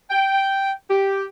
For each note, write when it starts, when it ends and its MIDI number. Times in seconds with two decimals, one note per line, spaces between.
0.10 0.71 79
0.90 1.24 67